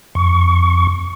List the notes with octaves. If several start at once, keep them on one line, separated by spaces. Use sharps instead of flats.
F2 C#6